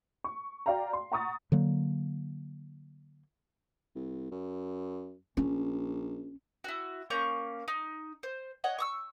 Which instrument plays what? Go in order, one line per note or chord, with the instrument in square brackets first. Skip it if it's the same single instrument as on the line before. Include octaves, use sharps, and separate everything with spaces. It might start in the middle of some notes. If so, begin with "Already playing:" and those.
[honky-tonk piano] C#6
F#4 D5 F5 G5 A#5
C6
F#5 A#5 C#6 D#6 A6
[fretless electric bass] D3 F#3 A#3
[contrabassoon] C2
F#2
[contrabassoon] A#1 [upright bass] C#4
[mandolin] E4 F#4
A#3 C#4 C#6 G6
D#4
C5
C#5 D#5 F#5
C#6 D#6 E6